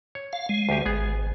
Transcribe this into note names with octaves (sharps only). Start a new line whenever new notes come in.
C#5
F5
G#3
D2 G4
G#1 B3 G#4